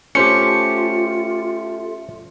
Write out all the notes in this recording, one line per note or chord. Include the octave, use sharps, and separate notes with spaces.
A3 C#4 F4 G4 C5 C#7